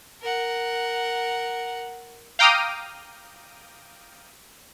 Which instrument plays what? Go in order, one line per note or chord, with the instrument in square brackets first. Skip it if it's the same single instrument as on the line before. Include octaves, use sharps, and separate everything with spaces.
[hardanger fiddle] A#4 F#5
[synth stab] F5 G5 A#5 D6 D#6 F6